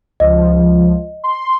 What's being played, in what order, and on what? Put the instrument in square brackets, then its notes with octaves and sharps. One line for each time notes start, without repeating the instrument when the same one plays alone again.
[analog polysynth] C#2 F3 [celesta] D#5
[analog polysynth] C6